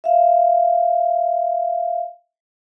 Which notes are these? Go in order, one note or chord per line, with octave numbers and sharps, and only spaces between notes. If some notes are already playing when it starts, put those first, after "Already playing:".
E5 F5